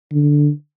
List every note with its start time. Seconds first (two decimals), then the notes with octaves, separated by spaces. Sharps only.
0.12 D3